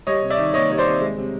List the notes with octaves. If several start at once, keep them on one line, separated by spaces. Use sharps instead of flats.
G3 C#5 D#5
C3
D5 E5
D#3
A#3 C#5 D#5
G3 C#5
C5 D5
C3
G#3
C3